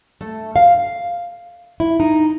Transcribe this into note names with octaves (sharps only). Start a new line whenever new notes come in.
A3
F5
E4
D#4